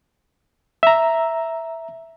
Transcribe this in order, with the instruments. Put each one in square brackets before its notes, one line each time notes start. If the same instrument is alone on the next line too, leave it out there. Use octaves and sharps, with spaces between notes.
[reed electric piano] E5 A#5